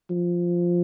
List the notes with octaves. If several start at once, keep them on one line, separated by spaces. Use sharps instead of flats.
F3